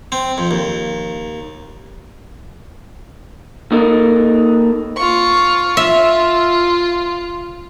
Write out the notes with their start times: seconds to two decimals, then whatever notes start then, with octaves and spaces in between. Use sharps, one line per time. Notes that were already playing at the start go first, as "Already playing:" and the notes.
0.12 C4
0.38 F2
0.51 D#2
3.72 A#3 D#4 A4 A#4
4.96 F4 C#6
5.77 F4 E5